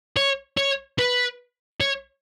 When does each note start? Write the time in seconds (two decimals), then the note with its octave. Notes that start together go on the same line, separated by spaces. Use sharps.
0.17 C#5
0.57 C#5
0.99 B4
1.81 C#5